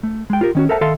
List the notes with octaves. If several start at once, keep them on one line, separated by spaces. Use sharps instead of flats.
A3
G#3 G5
F4 G4 A#4
D#3 C#4 F#4
A4 A#4 C5 E5 F#5 A5
D#3 A4 E5 F5 A5 C6